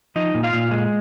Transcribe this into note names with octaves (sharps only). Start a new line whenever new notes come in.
F3 D#4 D#5
A#2
F4 F5
A#2
G#3